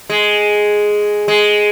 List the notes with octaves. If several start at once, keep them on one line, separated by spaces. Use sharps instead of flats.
G#3
G#3